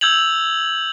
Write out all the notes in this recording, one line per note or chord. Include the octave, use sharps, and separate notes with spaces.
E6 G6 G#6 F7 F#7